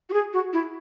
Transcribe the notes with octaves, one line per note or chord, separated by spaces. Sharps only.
F#4
G#4
F#4
E4